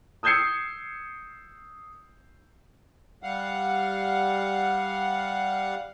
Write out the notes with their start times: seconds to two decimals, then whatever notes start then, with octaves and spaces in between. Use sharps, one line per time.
0.23 D#6 E6 G6 G#6 C7 C#7
3.23 G3 F5 F#5